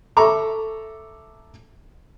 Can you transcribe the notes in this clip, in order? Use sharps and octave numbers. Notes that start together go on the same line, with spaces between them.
A4 E5 A#5 C#6 D6